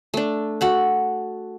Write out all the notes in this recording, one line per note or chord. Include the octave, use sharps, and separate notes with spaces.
A3 D4
F#4 A4 F#5